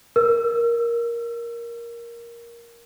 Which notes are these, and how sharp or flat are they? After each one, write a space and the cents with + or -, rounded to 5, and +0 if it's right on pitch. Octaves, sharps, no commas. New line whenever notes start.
A#4 +10 E6 +40